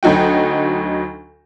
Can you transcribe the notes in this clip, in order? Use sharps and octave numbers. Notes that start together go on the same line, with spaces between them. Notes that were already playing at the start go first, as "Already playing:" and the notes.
D2 F#3 D#4 F#4 G5